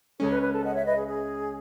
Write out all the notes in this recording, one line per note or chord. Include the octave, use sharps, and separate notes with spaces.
C#2 C#3 G#3 C#4 A4 C#5
B4
B4
A4
D#5 F#5
C#5 E5
B4 D#5
G#4
G#4